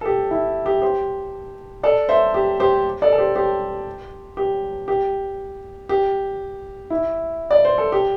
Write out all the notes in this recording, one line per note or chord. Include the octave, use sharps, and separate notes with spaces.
A4
G4
E4
G4
G4 C5
A4 D5
C5 E5
G4
G4 C5
A4 D5
A4
G4 C5
G4 C5
G4
G4
G4
E4
D5
C5
A4
G4